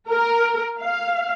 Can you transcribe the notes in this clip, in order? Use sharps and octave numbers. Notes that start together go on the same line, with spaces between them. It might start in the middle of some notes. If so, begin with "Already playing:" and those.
A#4
F5